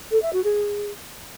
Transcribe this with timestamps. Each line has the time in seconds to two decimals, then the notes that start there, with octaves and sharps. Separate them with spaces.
0.11 A4
0.22 E5
0.33 F#4
0.44 G#4